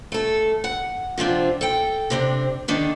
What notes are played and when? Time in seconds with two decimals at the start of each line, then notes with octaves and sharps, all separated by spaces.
0.12 A3 A4
0.64 F#5
1.18 C3 F3 C4 D4
1.61 A4 G5
2.10 C3 C4 D4
2.68 D3 D#3 D4